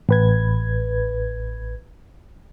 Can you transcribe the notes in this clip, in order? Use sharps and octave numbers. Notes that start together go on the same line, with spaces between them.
A1 B4 G#6